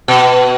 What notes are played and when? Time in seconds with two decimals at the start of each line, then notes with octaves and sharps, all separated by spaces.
0.08 B2